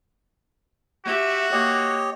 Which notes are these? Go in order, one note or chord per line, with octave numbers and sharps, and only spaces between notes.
F#4 G4 E5
A#3 G4 C#5 D#5